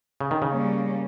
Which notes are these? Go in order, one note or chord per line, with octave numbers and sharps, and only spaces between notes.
C#3
D#3
C#3
G3 A#3 C#4